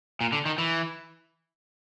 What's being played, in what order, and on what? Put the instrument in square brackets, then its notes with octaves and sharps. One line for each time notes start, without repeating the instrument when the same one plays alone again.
[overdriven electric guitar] A#2
D3
D#3
E3